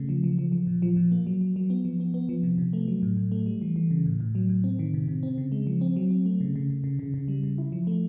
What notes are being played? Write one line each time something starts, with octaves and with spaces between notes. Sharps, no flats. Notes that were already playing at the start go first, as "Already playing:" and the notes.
Already playing: C#3 A3
F3
F3
F3
F3
A#2
F3
A#2
A#3
F#3
F#3
F#3
B3
F3
B3
B3
F3
C3
C3
A3
F#3
A2
A2
A3
G3
E3
E3
C#3
A2
A2
F#3
A2
C4
D#3
C3
C3
C4
C#3
G#3
F3
C4
F#3
C4
A3
C#3
C#3
C#3
C#3
C#3
C#3
G3
C#3
E4
F3
A3